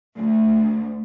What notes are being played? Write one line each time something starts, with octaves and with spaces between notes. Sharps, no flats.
D2